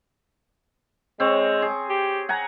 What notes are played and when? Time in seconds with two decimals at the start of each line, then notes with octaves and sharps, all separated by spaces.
1.20 G#3 C4 C#5
1.62 G#4
1.89 G4
2.29 F#5 G#5 A#5